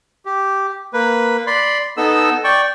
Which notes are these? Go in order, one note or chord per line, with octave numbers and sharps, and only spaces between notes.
G4
A#3 B4
D5 B5 C6
B3 D#4 A4 E6
D5 G5 C#6